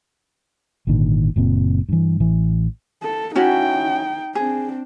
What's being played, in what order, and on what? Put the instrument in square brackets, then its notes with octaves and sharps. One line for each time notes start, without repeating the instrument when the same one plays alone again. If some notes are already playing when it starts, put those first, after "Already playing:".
[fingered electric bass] G#1 A#2 D3 D#3
F#1 A#2 C4
G2 E3
A1 E3
[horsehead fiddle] A4
[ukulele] C#4 E4 F#4 [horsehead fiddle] D#4 G5
[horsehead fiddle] C4 D4 [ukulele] G#4